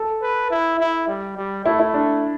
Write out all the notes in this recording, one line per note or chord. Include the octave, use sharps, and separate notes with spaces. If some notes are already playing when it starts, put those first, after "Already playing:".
Already playing: A4
B4
E4
E4
G3
G3
A3 E4
E4
D4